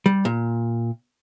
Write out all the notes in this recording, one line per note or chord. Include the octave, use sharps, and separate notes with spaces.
G3
A#2